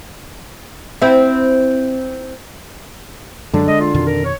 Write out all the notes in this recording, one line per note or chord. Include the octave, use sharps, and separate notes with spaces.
C4 E4
F#2 D3 F#3 G#3 D4
G#3 D#5
F4
F2 B2 D#3 F4
A#4
C#5